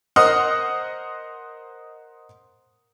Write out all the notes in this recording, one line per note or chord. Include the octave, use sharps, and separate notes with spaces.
A#4 C5 D#5 F#5 D#6 F6